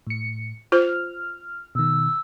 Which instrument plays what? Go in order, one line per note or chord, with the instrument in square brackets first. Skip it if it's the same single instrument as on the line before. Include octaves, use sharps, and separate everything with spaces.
[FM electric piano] A2 C#7
[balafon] F4 C5 [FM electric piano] F6
[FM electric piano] B2 D#3 [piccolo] E6